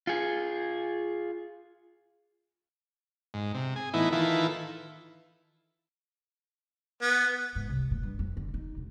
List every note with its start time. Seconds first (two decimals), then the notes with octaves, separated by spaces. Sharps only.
0.07 F4 G#4
3.34 G#2
3.55 C3
3.76 G#4
3.94 A2 E3 B3 D#4 E4
4.13 D#3 E3 E4 F4 A4 B4
7.02 B3
7.55 G#2
7.69 C2
7.91 A#2
8.03 G2
8.19 F2
8.37 D3
8.54 D#4
8.77 E1